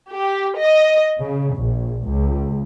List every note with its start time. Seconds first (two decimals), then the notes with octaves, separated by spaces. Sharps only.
0.11 G4
0.58 D#5
1.20 C#3
1.56 A#1
2.07 C#2